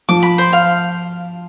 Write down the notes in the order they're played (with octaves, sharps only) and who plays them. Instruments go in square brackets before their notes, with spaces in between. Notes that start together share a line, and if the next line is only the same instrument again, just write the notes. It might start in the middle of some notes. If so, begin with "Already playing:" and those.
[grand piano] F3 [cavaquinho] D6
[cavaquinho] B5
C5
F5